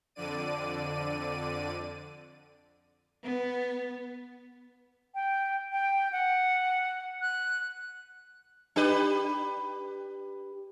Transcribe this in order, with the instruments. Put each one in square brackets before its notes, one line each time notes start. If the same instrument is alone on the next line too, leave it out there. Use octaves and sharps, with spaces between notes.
[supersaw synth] F2 D3 D5 D#7
[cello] B3
[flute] G5
G5
F#5
F#6
[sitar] D4 G4 B4